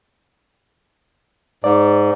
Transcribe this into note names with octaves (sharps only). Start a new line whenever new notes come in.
G#2 D5